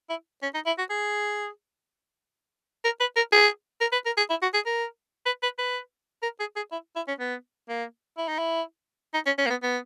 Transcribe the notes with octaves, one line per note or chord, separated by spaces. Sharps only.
E4
C#4
D#4
E4
F#4
G#4
A#4
B4
A#4
G#4
A#4
B4
A#4
G#4
E4
F#4
G#4
A#4
B4
B4
B4
A#4
G#4
G#4
E4
E4
C#4
B3
A#3
E4
D#4
E4
D#4
C#4
C#4
A#3
B3
B3